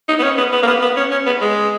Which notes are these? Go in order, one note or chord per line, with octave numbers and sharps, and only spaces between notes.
D#4
B3
C#4
B3
B3
A#3
B3
B3
C#4
C#4
B3
G#3